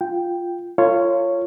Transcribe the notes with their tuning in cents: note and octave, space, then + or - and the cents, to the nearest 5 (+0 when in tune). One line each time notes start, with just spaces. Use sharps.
F4 +0 G5 +0
F4 -15 A4 +45 C#5 +0